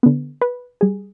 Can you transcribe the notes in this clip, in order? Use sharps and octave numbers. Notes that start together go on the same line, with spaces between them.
D3 B3
B4
G3 G#4